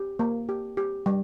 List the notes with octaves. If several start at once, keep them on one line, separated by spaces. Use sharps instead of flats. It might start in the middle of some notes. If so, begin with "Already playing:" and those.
Already playing: G4
A#3
G4
G4
G3